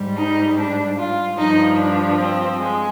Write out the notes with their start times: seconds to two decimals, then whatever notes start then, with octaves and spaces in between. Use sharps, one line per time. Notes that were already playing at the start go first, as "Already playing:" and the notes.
Already playing: G#2 G3
0.17 D#4
0.57 D4
0.97 F4
1.37 G2 F3 D#4
1.78 D4
2.19 C4
2.59 G#3